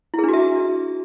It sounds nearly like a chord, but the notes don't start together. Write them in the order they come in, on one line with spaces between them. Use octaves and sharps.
E4 G#4 D4 F#4 E5